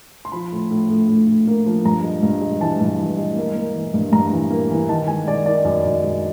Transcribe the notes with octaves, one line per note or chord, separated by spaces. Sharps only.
C6
F3 B5
A2
A2
A2
A2
A2
A#3
F3
G2 A#5
G#3
G2
G#3
E3 A5
G2
E3
G#3
A#3
A#3
E3
G2
G2 A#5
E3
A#3
E3
D#3 A5
G#3 G#5
G#3 D5
D#3 D5
F#2 D5
F#2
G#3